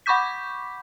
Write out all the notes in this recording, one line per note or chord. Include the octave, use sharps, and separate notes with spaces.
F#5 B5 C#6 D6 G6 B6